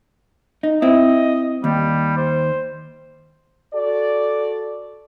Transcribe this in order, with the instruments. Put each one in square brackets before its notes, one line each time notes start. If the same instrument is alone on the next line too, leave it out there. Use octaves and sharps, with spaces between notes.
[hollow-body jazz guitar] D#4
[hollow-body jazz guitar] C4 E4 [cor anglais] D#5
[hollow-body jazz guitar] D#2 [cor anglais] G3
[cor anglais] C5
[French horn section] F#4 A4 D5